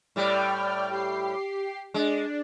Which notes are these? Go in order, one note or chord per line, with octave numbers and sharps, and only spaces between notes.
A2 G3 D5 G5 F6
G4 C7
G#3 D4